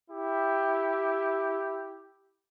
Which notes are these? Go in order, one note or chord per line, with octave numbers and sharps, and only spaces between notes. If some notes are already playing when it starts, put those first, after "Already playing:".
E4 G4